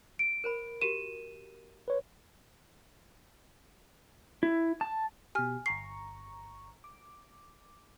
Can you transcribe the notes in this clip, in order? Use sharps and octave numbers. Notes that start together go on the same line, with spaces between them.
D7
A#4 C5 B5
F#4 G4 A#4 D#7 E7
B4 C#5
E4
A5
B2 G4 G#5 F6
G1 A#5 C#6 C7
D6